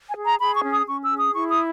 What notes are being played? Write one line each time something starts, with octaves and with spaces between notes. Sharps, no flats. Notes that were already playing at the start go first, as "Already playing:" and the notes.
G#5
G#4
A#5
G#4 B5
C#6
C#4
D#6
C#4 C#6
E6
G#4
D#6
E4 C#6
D#6